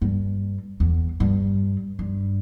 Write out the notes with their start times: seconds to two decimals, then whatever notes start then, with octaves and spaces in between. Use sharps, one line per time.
0.02 G2
0.80 E2
1.20 G2
1.99 G2